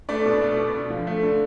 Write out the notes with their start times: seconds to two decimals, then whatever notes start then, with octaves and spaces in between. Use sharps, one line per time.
0.09 A3 D4 D5
0.25 B2
0.42 A3
0.57 B2
0.74 D3
0.90 F3
1.07 A3
1.23 D3